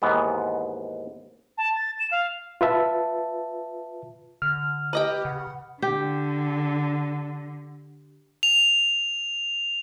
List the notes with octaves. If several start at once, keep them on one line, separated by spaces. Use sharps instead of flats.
D#2 G#2 E3 B3
A5
A6
E7
F5
F4 B4 E5 A5
D3 F6
G4 B4 D#5 G5
C#3 F#5
D3 G4
F7